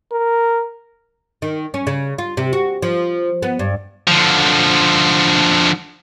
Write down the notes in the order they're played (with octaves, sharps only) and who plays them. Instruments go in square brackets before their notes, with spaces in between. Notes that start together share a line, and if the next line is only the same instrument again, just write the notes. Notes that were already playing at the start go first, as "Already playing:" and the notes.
[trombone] A#4
[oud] D#3
C#4
C#3
F4
C3
F#4
F3
B3
G2
[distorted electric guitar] D3 F3